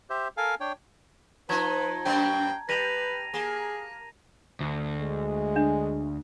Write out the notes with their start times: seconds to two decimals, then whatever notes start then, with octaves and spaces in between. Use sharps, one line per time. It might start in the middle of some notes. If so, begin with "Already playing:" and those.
0.10 G4 C5 E5
0.37 A4 A#4 F5 G#5
0.60 D4 C#5 G5
1.49 F3 D#4 B4 A5 A#5 G#6
2.05 F#2 A#3 C4 G5
2.69 G3 B4 A#6 D#7 F7
3.34 A#3 G#4
4.60 D2
4.99 G#3
5.56 D4